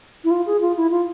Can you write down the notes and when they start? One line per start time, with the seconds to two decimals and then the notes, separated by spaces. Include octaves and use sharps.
0.24 E4
0.31 F4
0.46 G#4
0.62 F4
0.77 E4
0.91 F4